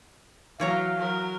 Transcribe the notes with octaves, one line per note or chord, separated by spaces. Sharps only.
E3 F#3 C#5 F5 A#5
F#3 A#4